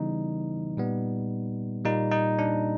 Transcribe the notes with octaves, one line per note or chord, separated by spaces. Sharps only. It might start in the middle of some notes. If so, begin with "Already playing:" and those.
Already playing: C#3 E3 G3 B3 D#4
A#2 G3 B3
A#2 G3 A#3 D#4
D#4
D4